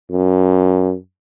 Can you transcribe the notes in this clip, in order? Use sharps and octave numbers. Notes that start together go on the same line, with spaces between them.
F#2